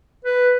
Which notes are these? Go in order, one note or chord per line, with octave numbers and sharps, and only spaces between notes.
B4